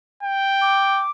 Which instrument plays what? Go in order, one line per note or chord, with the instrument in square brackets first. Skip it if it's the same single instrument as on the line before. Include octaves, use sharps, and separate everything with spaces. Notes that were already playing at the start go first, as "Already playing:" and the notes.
[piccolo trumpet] G5
[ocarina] D6